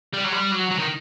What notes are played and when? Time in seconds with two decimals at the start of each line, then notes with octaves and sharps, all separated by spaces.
0.13 G3
0.24 F#3
0.32 G3
0.51 F#3
0.71 F#3
0.78 D#3